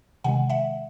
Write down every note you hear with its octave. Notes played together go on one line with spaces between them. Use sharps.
C3 D#3 G#3 F#5 G#5
E5 F#5